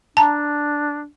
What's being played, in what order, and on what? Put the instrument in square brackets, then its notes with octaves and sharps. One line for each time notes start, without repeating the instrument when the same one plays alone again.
[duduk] D4 [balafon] A5 A#5